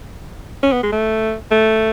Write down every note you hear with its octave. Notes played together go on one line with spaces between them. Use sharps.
C#4
B3
G#3
A3
A3